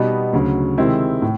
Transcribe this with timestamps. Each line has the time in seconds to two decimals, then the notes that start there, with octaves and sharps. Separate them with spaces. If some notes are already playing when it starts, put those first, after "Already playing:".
Already playing: B2 G3 B3 D#4
0.33 D2 C#3 F#3
0.78 C3 D#3 G#3 C4 E4
1.22 A2